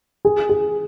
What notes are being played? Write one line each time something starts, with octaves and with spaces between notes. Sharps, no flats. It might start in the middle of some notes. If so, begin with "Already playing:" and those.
G#4
G#4